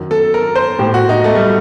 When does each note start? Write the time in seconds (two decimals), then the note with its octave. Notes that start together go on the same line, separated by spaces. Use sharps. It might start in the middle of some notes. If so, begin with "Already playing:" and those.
Already playing: F#2 D#3
0.11 A4
0.34 A#4
0.56 C5
0.79 A2 G4
0.94 F#4
1.09 D#4
1.24 A3
1.35 G3